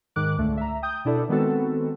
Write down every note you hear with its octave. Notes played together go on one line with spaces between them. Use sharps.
G#2 D#3 D6 F#6
C#2 D3 A3
E5 A#5
G5 D#6 G6
B2 D4 E4 A4 D5
D#3 G#3 B3 C4 F#4 A4